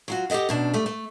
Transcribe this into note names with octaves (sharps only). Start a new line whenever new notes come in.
F#3 F4 F#4
G4 A4 A#4 D#5 F#5
F#2 B2 D4
G3 A3
A3